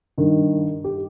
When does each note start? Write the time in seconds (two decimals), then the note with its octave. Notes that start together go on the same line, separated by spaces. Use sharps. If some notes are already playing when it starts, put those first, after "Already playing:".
0.18 G2 D#3
0.84 G4